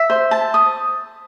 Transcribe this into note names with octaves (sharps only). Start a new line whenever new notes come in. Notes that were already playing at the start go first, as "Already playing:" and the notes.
Already playing: E5
C5
A5
D#6